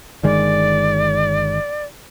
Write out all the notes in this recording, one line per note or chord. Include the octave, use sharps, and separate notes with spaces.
G1 D#3 G#3 D5